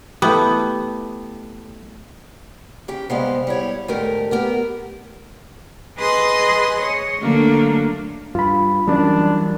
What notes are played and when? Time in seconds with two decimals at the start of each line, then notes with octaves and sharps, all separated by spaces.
0.22 A3 B3 E4 G4
2.88 C#3 G4
3.10 C3 G3 G#3 B3 C5 F5
3.47 G3 E4 C#5
3.88 D2 G#2 A3 G4 A#4
4.31 B3 G4 A#4
5.99 G#4 B4 D#5 C6 D#6
6.81 C#5
7.22 D3 F#3 A3 A#3 D4
8.35 G2 F4 B5
8.88 F#2 E3 G3 D4